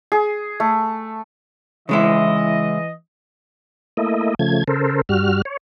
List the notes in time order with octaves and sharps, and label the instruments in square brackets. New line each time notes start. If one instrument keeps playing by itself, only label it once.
[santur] G#4
A3
[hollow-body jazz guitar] C#3 G#3 E4 [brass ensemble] E3 D#5
[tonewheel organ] A3 A#3 E4 D#5
C#3 F3 A3 G#6
C#3 A4 A#4 C5
G2 G3 F#4 F6
C#5